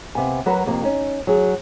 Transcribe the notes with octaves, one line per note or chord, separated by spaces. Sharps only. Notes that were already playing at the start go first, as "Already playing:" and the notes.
C3 B3 F5 G#5
F#3 F#4 A#4 B4 C#5
F2 C3 A#3
C#4 D#4
F#3 G#4